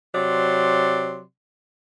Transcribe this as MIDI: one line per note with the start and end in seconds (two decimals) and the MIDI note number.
0.14 1.22 48
0.14 1.22 54
0.14 1.22 74
0.14 1.22 84